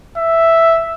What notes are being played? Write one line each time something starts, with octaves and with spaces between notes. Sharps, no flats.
E5